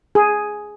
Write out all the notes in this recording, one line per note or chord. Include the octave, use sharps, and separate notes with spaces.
G#4